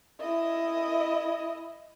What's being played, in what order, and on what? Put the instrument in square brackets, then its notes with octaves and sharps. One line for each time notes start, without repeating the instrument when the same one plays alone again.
[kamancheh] E4 D#5